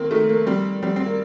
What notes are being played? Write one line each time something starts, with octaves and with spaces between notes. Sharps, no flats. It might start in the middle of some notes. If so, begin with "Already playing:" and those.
Already playing: D#3 A#3 C4
D#3 A3
A#3
G3 C4
G3 C4
C4
A#3